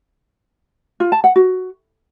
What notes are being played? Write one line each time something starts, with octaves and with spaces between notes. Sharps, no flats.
F4
A5
F#5
F#4